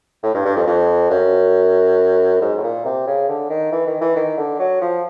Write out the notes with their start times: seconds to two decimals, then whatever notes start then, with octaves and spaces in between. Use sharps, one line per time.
0.23 A2
0.35 G2
0.45 G2
0.56 F2
0.67 F2
1.11 F#2
2.42 G#2
2.58 A2
2.63 A#2
2.85 C3
3.07 C#3
3.29 D3
3.50 D#3
3.72 E3
3.87 D#3
4.01 E3
4.16 D#3
4.38 D3
4.60 F#3
4.81 F3